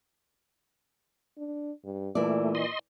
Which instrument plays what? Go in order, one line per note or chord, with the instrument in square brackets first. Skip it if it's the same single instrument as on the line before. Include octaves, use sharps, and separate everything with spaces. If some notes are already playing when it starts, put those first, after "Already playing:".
[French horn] D4
G2
[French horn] A#2 [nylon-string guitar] E3 D5 [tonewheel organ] A3
[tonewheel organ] D#5 C6